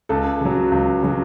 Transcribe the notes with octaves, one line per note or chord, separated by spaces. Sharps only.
C#2 A4
C#3 F#3
C#2
C#3 F#3